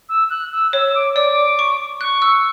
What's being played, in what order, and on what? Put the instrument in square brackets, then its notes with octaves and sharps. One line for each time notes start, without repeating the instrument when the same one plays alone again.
[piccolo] E6
F#6
E6
[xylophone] C#5 [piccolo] E6
[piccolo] E6
D6
[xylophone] D5 [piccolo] D6
[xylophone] C#6
[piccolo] C#6 [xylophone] F#6
[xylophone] E6